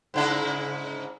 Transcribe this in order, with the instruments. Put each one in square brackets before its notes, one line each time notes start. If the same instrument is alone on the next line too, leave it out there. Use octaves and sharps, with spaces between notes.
[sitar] G#2 C#3 E4